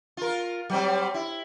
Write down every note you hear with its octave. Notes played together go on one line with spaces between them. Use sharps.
F4 A#4
F#3 G3 C4
E4